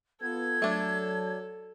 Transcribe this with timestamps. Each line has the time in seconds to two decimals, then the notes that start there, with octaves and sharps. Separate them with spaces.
0.22 B3 F4 A4 G#6
0.62 F#3 A3 D4